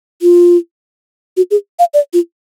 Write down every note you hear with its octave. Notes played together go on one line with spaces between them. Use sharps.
F4
F#4
G#4
F5
D5
F4